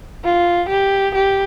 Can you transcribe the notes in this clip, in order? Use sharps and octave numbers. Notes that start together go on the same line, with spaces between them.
F4
G4
G4